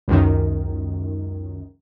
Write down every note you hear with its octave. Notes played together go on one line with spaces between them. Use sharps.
C#2 F#2 D#3